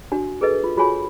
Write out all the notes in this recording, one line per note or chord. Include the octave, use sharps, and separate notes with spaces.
D4 F#4
G#4 A4 B4 D#5
F4
F4 F#4 G#4 C#5 G#5 B5